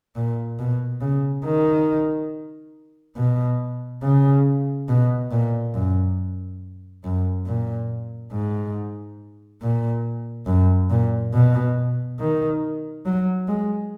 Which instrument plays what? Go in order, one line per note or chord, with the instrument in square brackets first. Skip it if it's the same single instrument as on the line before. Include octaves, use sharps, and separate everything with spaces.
[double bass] A#2
B2
C#3
D#3
B2
C#3
B2
A#2
F#2
F#2
A#2
G#2
A#2
F#2
A#2
B2
D#3
F#3
G#3